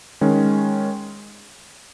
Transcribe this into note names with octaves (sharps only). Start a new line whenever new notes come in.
D#3 G#3 C#4